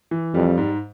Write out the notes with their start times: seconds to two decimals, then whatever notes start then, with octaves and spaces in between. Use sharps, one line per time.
0.11 E3
0.34 F2 G3
0.58 G#2